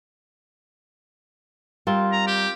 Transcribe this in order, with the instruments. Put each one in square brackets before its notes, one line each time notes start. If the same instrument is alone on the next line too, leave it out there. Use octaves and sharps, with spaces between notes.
[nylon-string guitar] G3 [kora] C4 F4 A#4
[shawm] A#5
G4